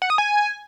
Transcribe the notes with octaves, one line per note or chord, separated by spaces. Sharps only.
F#5
D#6
G#5